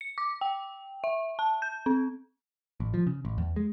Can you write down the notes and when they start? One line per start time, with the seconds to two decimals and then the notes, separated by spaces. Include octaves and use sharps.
0.01 C#7
0.18 D6
0.41 G5
1.04 E5
1.39 A5
1.62 G6
1.86 C4
2.80 A1
2.94 F3
3.07 C#3
3.25 A1
3.38 E2
3.56 G#3